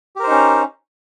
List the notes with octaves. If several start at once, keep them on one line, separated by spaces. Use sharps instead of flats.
C#4 D#4 G4 A#4 C5